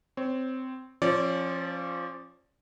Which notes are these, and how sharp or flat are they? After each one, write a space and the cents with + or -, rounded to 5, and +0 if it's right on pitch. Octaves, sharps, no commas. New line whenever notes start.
C4 -10 C#5 +10
F3 +0 C#4 -35 D5 -15